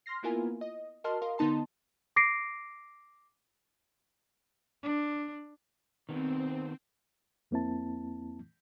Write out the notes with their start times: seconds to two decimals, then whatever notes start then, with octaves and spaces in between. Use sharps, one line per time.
0.06 C6 F6 A#6 C7
0.23 A#3 B3 E4 F4 A#4 G#5
0.61 D#5
1.04 F#4 A#4 D#5 A5 C6 F6
1.22 A#4 D#5 F5 C6
1.38 D3 B3 D#4 A5 C6
2.16 D6 A#6 C7 D7
4.83 D4
6.09 D#3 B3 C4
7.51 F2 A#3 C4 E4 A5